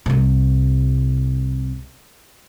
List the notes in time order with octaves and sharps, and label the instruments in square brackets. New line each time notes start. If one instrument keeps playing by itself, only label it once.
[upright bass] C2 C3